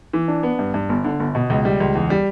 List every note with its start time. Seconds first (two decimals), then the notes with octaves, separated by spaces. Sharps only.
0.13 E3
0.28 D4
0.43 B3
0.59 G2
0.74 G2
0.89 G1
1.05 D3
1.20 G1
1.35 B2
1.50 C#2
1.65 G3
1.80 C#2
1.95 E2
2.10 G3